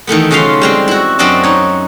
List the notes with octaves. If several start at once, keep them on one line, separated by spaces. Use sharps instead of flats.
D#3 E3 A3 B3
C#3 F#3 C#4 F4 F5 C6
G3 G#3 C4
E4 F#4
F#2 C4 D4 F#4 D#5 A5
D#4 C#5